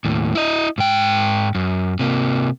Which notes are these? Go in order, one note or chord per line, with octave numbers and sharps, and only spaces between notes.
D#2 A2
E4 D#5
G#2 G5
F#2
C3 A#3